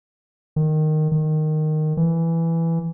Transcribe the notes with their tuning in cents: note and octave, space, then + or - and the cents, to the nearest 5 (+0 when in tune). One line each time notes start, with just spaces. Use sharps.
D#3 -10
D#3 -10
E3 +5